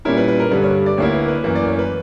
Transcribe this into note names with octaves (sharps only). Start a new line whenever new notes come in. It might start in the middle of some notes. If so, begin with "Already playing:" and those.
A#2 G3 C#4 E4 A#4
B4
B4
A#4
G2 D3 G3 B4
C#5
D5
D2 D3 A#3 E4 C#5
B4
B4
F#2 E3 A#3 B4
D5
C#5
B4